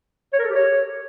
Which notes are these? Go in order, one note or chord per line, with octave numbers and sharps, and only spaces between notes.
C#5
A#4
A4
G4
C#5